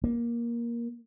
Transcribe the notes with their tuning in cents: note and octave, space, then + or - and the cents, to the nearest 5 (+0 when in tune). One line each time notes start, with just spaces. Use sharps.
A#3 +15